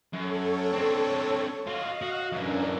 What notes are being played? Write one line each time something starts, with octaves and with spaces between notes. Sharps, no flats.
F#2 A4 C#5
C4 D4
F4 F#4 D#5 F5
F#4
F#2 E3 C#4 D4 A#4